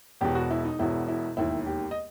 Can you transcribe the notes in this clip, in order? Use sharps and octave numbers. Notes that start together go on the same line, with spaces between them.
E1 E2 B2 G4
F#4
E4
D#4
E1 E2 B2 E4
E4
E1 D#2 D#3 E4
G4
D#5